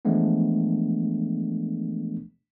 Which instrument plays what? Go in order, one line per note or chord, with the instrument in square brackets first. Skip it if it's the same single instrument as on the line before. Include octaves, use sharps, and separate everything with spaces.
[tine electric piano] E3 F3 G#3 A3 B3 D4